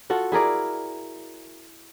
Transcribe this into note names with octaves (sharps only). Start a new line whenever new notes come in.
F4 F#4 A4 F#5
E4 G#4 A#4 D5